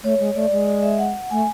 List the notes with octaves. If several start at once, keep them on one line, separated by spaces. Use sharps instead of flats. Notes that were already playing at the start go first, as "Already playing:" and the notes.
A3 C#5
G#3
A3 D5
G#3
D5
E5
F#5
A3 G#5